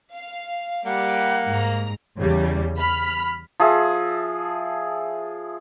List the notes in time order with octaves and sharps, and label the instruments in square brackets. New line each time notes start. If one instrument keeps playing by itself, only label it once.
[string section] F5
[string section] G3 [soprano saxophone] A#3 [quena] F#5
[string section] G#2 A#5
E2 C#3 G3
B5 F6
[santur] F3 G#4 E5